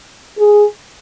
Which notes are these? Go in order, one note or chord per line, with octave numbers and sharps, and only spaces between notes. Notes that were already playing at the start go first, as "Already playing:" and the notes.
G#4